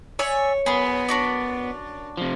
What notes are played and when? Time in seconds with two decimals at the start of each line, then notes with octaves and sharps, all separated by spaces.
0.19 C#5 D5 E5 G#5
0.66 F#2 B3 G#4 B5
1.09 D4 F#4 D5
2.17 C3 F3